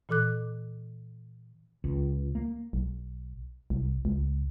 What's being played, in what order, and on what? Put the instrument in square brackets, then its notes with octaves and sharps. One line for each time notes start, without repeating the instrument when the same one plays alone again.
[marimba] A#2 E3 A4 D6 F#6
[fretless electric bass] C#2
A#3
[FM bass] B1
C2
C#2